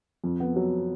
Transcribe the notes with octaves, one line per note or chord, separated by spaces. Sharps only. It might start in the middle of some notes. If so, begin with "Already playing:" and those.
F2
B3
F#3